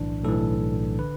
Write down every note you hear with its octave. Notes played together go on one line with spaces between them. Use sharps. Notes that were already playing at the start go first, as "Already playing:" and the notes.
Already playing: B1 A2 E3 D4
B1 A2 E3 A4
D3 B4